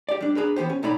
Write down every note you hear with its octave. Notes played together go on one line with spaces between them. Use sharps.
G4 D5
G3 D4
D4 G#4 A#4 B4
E3 B3 G4 C5
C#4
B1 A2 D#4 C#5 D5 B5